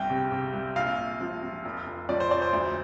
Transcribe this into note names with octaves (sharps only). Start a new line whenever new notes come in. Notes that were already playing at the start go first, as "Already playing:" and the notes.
Already playing: G1 C2 G5
C3
C3
C2
A#1 F5
A#1
F3
F3
F1
F1
F3 D5
C5
F1 D5
C5
D2